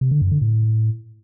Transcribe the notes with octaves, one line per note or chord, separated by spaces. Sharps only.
C3
D3
F#2
D3
A2